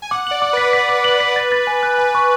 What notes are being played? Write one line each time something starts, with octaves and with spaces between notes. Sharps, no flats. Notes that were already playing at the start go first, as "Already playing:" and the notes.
G#5
F#5 D6
D5 F#7
D6
B4 B6
B4 B6
D6
F#7
B6
A6
A6
G#5
F#6
B4 G#5
C#6